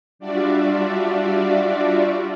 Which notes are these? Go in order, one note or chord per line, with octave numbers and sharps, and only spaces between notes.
G3 D4 F4 F#4 D5 E5